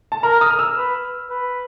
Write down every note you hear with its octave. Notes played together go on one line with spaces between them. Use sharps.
A5
A#4 A#5
D#6
F6
E6
B4
B4